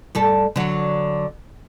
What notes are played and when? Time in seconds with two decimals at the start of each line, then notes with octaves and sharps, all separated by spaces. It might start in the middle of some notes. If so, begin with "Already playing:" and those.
0.15 G2 G3 A4
0.56 D3 F#3